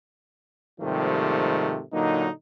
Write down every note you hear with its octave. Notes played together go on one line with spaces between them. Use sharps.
G#2 C3 D#3 F3 G3 A3
A#2 D3 F#3 A#3 D#4